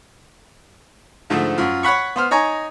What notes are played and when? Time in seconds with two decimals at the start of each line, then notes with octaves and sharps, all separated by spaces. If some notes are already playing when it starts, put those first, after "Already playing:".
1.30 G#2 D3 F3 A3
1.58 F#2 F4
1.83 C#5 F#5 B5 C#6
2.16 B3 C5 F6
2.31 D#4 C#5 G#5 A#5